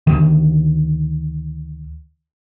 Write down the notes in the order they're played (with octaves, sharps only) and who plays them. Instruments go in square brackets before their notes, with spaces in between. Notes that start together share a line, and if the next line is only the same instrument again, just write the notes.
[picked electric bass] D2 D#3